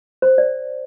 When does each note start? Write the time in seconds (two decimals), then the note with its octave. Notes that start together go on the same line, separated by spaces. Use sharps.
0.22 C5
0.38 D5